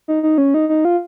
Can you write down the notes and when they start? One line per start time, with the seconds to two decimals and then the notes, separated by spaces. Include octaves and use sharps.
0.08 D#4
0.23 D#4
0.38 C#4
0.54 D#4
0.69 D#4
0.85 F4